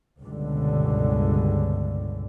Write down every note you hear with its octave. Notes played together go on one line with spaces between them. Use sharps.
C#2 G2 B2 D3